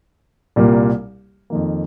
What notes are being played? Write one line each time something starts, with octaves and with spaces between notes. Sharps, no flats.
C2 A#2 G3 A#3
F2 D#3 A#3